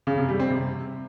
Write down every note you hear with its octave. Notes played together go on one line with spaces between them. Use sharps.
C#3
C3
G3
C4
C3